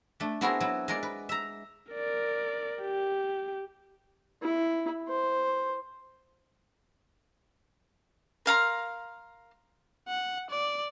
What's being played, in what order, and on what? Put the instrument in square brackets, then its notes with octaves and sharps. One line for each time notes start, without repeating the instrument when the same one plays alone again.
[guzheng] A3 D4
B3 C4 E4 F#4 G#4 A#4
F#3 E4
G#3 A#4 D5
B4
E5 A#5
[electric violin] A#4 D5
G4
[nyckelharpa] E4
C5
[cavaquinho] A#4 F5 A#5 C6
[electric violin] F#5
D5